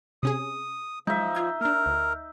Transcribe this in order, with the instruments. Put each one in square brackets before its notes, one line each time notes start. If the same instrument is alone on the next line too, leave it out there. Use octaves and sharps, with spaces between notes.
[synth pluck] C3 C#4 G#4 [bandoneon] D#6
[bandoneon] F3 [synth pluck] F#3 G#3 [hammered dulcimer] D#4 E5
[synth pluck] F4 G#6
[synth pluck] A#3 D4 [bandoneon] A#4
[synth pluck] D2